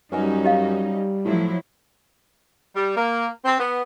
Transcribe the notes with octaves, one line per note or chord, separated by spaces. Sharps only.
F#2 G3 C#4 D#4 B4 G#5
G4 D#5 F5
A2 F3 F#3 E4
G3
A#3
C4
B3